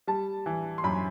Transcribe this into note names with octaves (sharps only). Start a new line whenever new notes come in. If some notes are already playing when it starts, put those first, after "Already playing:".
G3 A5
E3
C6
F#2 B5